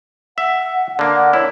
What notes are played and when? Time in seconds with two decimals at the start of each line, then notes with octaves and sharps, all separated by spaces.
0.38 E5 F#5
0.99 D3 A#3
1.14 F#5
1.33 E4 C#5